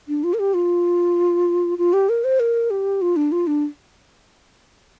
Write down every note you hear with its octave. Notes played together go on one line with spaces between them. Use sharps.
D4
F4
A#4
G4
F4
F4
G4
A#4
C5
A#4
G4
F4
D4
F4
D4